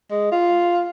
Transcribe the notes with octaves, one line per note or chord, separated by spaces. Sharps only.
G#3
F4